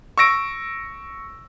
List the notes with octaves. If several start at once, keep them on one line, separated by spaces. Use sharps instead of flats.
C#6 E6 A#6 D7